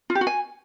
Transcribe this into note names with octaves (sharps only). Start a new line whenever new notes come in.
F4
G4
F#4
G#5